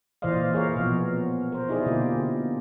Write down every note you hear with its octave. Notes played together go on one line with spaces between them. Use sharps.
A#2 E3 C5 D5 D#5 F5
G#4 A#4 C#5 F5
B2 F3 B3
A#4 C5
D#4 E4 G4 G#4 D5 D#5
B2 D3 A#3 D#4 F4 G4